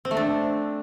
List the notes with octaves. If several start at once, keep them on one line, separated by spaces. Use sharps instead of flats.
C4
A3
D4